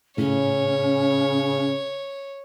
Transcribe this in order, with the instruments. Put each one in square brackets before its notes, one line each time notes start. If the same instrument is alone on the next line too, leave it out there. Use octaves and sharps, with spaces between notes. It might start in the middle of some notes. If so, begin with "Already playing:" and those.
[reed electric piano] A2 [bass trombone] C#3 [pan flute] C#4 [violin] C#5